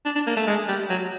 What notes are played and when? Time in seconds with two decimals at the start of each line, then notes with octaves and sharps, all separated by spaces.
0.05 D4
0.15 D4
0.27 A#3
0.37 A3
0.47 G#3
0.68 G3
0.90 F#3